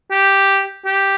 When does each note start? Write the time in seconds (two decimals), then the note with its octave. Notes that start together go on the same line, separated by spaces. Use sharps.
0.11 G4
0.85 G4